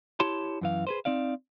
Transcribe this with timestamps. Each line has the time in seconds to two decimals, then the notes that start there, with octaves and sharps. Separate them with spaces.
0.20 E4 G4 C#5 A5 C6
0.61 F#2 E3 F5
0.87 G#4 B4 C5
1.05 C4 D#4 D5 F5